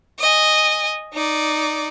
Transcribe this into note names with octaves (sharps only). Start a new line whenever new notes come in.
D#5 G#5
D#4 D5